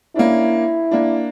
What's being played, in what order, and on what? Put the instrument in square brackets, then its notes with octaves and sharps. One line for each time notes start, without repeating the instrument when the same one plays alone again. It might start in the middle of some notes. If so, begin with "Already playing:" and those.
[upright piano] A#3 C#4 D4 [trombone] E4
[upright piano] A#3 D4